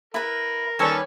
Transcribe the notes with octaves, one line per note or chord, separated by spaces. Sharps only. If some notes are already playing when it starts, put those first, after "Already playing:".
E4 A#4 B4
D#2 G3 C#4 A4 B4 C#5 G#5